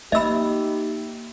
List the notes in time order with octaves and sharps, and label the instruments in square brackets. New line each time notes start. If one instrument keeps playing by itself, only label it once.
[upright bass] A#3 [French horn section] D#4 G4 [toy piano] D#5 E6 [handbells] E5 B5